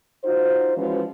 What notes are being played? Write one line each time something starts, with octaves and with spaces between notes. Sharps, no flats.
D#4 F4 F#4 C5
E3 F3 G#3 C#4 F#4 B4